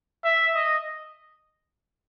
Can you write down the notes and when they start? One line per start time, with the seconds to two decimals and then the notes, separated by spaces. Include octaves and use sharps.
0.25 E5
0.55 D#5